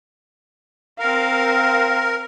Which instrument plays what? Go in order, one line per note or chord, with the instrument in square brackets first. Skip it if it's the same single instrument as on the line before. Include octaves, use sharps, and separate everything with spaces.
[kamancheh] C4 F5 [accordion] A#4